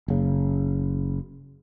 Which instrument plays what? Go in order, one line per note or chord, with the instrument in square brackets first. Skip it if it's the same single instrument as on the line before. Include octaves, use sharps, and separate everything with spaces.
[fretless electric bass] F#1 C#3